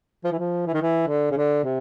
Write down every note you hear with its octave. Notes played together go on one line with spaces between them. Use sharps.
F3
E3
F3
E3
D#3
E3
D3
C#3
D3
C3